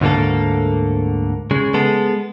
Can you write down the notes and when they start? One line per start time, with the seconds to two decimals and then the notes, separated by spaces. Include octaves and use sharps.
0.01 D2 G#2 D3 A#3 A4
1.51 C#3 G#3
1.74 G#3 B3 A4